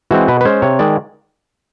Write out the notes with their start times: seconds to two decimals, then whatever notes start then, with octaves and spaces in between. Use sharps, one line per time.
0.11 E3 G#3 C4 F#4
0.28 B2 B4
0.41 B4
0.45 G#3 C#4 C5
0.62 C3 C#5
0.79 D#3 G#3 D5